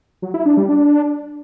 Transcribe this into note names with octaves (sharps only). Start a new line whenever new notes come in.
F#3
E4
D4
G3
D4